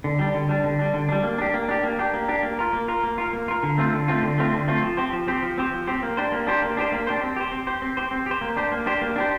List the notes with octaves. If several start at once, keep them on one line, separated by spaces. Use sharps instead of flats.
D3
G3 D4
D3
G3 D4
D3
G3 D4
D3
G3 D4
A#3
D4 G4
A#3
D4 G4
A#3
D4 G4
A#3
D4 G4
A#3
F4 A#4
A#3
F4 A#4
A#3
F4 A#4
A#3
F4 A#4
D3
A3 C4 F4
D3
A3 C4 F4
D3
A3 C4 F4
D3
A3 C4 F4
F3
C4 G4 C5
F3
C4 G4 C5
F3
C4 G4 C5
F3
C4 G4 C5
A#3
D4 G4 C5
A#3
D4 G4 C5
A#3
D4 G4 C5
A#3
D4 G4 C5
C4
G4 C5
C4
G4 C5
C4
G4 C5
C4
G4 C5
A#3
D4 G4 C5
A#3
D4 G4 C5
A#3
D4 G4 C5